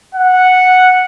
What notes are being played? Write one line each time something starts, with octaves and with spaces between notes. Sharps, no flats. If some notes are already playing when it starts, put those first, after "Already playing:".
F#5